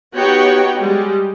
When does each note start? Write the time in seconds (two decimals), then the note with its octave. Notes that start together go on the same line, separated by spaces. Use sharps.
0.15 B3 D#4 F#4 G4 C#5 G5
0.78 G3 G#3